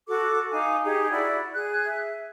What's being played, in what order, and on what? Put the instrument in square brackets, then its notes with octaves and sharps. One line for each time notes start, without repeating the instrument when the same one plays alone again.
[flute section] F#4 A4 D6
D#4 F5 G#5 D6
D#4 G4 G#4
E4 F#4 D5
G#4 F#6
E5